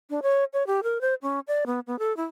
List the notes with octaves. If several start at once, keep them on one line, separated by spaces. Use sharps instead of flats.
D4
C#5
C#5
G4
A#4
C5
C#4
D5
B3
B3
A4
E4